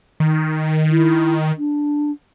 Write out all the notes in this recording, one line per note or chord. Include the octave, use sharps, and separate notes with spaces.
D#3
E4
D4